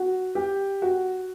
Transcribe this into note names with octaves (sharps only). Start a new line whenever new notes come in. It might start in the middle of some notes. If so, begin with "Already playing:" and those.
Already playing: F#4
G4
F#4